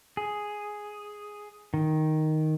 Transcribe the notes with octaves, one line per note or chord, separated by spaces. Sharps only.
G#4
D#3